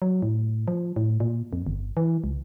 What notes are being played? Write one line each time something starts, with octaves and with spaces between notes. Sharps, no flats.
F#3
A2
F3
A2
A#2
F2
G1
E3
C#2